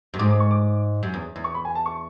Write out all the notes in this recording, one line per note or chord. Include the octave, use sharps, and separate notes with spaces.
F#2
G#2 D6
D6
C#6
D6
F#2
E2
E2
C#6
B5
G#5
A5
C#6